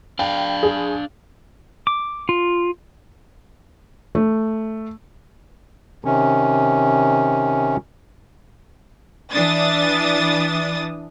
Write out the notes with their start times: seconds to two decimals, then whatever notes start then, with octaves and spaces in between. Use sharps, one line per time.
0.19 D4 F5 G5
0.63 G#4
1.87 D6
2.29 F4
4.15 A3
6.05 C3 D#3 C#4
9.32 E3 D4 D#6 A6